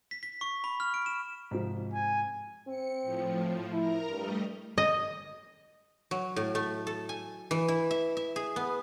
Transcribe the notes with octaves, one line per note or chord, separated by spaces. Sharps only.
B6
B6
C#6
B5
F6
D7
E7
G#2 C3 F3
G#5
C4 C#7
A2 F3
E4 A#4 A#5
G2 G3 A3 D#5
D#5
F#3
A2
A3
A4
G#5
E3
E4
E5
E5
G#4
B3